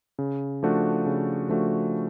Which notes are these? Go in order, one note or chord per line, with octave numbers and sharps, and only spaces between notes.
C#3
F3 A3 D4 F#4
C#3
F3 A3 D4 F#4